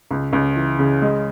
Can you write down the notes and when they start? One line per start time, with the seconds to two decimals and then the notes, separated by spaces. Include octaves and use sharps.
0.11 C#2
0.33 C#2
0.56 E3
0.79 C#3
1.02 G#3